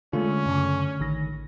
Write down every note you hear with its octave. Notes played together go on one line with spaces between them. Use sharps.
D3 G#3 A3 C#4 F4
F#2 C#3
A1 D#3 A#6